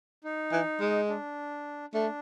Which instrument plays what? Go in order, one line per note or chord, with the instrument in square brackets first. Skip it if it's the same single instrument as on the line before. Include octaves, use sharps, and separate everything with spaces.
[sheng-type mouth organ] D#4
[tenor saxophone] E3
G#3
[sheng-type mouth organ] D4
[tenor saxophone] A3 [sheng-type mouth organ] D4